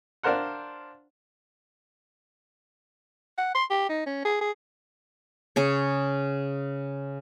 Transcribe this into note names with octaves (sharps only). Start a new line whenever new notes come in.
D4 F4 A#4 C5 F#5
F#5
C6
G4
D#4
C#4
G#4
G#4
C#3 G#4 C#5